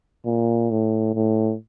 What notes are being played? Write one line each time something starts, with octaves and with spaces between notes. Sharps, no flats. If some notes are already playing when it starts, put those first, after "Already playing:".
A#2
A2
A2